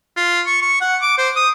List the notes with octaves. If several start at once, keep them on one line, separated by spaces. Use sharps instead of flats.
F4
C#6
C#6
F#5
D6
C5
D#6